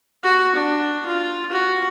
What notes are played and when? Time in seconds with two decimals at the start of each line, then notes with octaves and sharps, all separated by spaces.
0.23 F#4
0.55 D4
1.06 F4
1.52 F#4